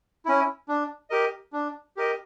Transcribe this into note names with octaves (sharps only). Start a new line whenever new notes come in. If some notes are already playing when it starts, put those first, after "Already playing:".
C#4 E4
D4
G4 A#4 D#5
D4
G4 A#4 D#5